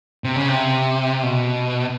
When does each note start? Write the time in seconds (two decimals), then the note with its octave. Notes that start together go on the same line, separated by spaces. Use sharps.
0.24 C3
0.36 C#3
0.49 C3
1.23 B2